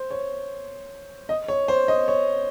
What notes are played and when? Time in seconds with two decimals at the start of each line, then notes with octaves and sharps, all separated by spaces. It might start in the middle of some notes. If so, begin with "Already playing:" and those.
Already playing: C5
0.11 C#5
1.29 D#5
1.48 C#5
1.68 C5
1.88 D#5
2.08 C#5